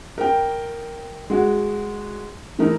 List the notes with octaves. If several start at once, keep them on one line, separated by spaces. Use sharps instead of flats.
A#4 G5
G#3 F#4
E3 A3 D#4 A#4